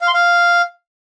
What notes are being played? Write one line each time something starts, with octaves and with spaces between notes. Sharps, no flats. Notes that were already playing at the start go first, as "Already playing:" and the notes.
F5
C6
F5